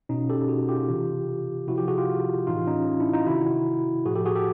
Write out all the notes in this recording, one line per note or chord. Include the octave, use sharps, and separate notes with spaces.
B2 C#4 D#4
G4 A4
F#4 G#4
F4 G4
C3 E3
C3 F3 E4 F#4
F4 G4
F#4 G#4
F4 G4
A2 E3 D#4 F4
C#4 D#4
D4 E4
D#4 F4
C3 D#3 E4 F#4
A2 F3 F#4 G#4
G4 A4
F#4 G#4
G4 A4